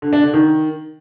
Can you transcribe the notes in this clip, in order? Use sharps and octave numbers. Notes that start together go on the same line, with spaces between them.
D3
D4
D3
D#3